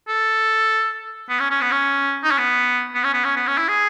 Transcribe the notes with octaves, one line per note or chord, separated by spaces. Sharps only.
A4
B3
C#4
C#4
B3
C#4
D#4
C#4
B3
B3
C#4
B3
C#4
B3
C#4
E4
G#4